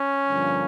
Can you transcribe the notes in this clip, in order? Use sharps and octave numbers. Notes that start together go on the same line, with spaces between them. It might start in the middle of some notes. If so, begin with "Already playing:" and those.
Already playing: C#4
G2 D3 F3 A#3